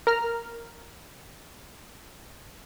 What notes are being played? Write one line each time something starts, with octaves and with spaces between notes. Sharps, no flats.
A#4 A#5 F6